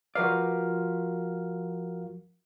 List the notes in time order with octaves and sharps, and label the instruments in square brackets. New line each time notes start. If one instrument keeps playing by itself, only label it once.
[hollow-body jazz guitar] F3 B4 D5 [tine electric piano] F#4 A#4 F5